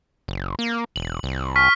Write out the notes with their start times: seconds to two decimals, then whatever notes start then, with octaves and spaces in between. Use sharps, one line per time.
0.28 F#1
0.59 A#3
0.96 E1 F#7
1.23 C2
1.56 C#6 F6 B6